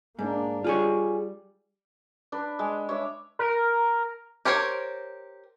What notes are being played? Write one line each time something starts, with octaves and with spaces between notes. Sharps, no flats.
G#2 A#3 D4
G3 F4 G#4 C#5
D4 B4
G#3
C#5 E5 D6
A#4
G4 A#4 C5 C#5